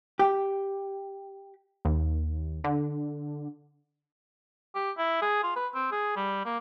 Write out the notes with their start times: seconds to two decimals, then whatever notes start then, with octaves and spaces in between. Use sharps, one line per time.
0.19 G4
1.85 D#2
2.64 D3
4.75 G4
4.98 E4
5.22 G#4
5.43 F4
5.56 B4
5.75 C4
5.92 G#4
6.16 G3
6.45 A#3